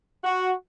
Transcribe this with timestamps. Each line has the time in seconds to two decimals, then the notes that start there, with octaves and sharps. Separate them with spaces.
0.23 F#4